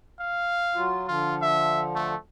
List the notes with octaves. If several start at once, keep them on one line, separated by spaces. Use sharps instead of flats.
F5
F#3 F4
D3 F3 F4
E5
A3